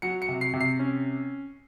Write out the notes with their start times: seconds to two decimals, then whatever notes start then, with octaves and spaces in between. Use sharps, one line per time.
0.02 F#3 C#7
0.22 C#7
0.29 C3
0.41 C7
0.54 C3
0.61 C7
0.79 C#4